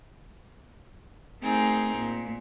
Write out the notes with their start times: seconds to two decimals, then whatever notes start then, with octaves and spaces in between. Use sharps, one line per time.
1.40 A3 C4 D#4 G#4 A#4
1.96 A#2